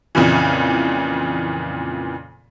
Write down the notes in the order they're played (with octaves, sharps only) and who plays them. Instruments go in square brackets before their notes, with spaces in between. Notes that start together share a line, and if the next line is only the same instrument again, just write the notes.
[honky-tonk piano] F2 A#2 C#3 E3